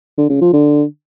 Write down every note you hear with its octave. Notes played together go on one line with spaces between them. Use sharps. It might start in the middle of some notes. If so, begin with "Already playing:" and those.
D3
C#3
F3
D3